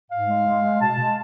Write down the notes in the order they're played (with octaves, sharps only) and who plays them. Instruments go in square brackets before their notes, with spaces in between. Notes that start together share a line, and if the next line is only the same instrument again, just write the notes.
[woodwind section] G#2 F5
G#3
G#3
G#3
B2 A5
G#3